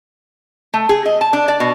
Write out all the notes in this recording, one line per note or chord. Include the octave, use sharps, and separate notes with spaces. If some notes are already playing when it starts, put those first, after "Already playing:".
A3
G#4
D#5
A5
D4
D5
B2